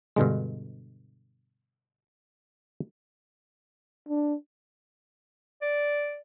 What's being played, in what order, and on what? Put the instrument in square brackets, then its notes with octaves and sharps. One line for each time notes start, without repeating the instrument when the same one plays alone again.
[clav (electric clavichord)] G2 B2 D3 G#3
[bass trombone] D4
[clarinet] D5